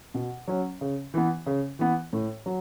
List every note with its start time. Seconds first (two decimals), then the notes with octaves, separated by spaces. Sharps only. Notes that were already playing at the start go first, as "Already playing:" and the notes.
0.14 B2
0.48 F#3 C#4
0.81 C#3
1.14 E3 B3
1.46 C#3
1.79 E3 B3
2.13 A2
2.46 F#3